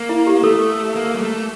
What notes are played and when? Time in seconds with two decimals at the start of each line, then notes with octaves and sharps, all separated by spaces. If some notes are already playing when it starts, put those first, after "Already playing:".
Already playing: A#3
0.09 E4
0.27 G4
0.44 A3 A4
0.96 A#3
1.15 G3
1.21 A3